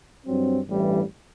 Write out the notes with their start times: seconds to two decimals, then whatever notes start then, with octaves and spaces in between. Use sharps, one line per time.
0.26 G2 F#3 C4
0.67 A1 G2 E3 G3